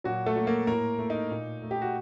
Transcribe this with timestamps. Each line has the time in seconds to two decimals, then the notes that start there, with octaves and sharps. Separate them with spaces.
0.04 A#2 F#3 F#4
0.26 A3 A4
0.36 F#3 A#3
0.47 A#3 A#4
0.67 A2 A#3 A#4
0.99 A3
1.10 D#4
1.31 A#2
1.62 A3
1.71 G4
1.82 F#4